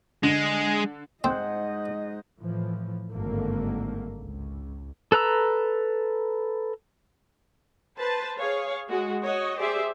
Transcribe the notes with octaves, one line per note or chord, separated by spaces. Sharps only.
D3 G#3
G#2 C4 C5 D#5 F#5
A2 E3 F3
G#1 G2 D3 A3 A#3
C#2
A4 B4 A#5 E6
B4 C5 A5
G#4 C#5 F5
G#3 F#4
F#4 C#5 D#5
G4 G#4 C5 D5 E5